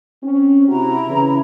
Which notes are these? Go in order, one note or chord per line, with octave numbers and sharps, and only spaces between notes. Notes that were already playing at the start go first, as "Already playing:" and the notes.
C4 C#4
C3 E4 F#4 A#5
C#3 E3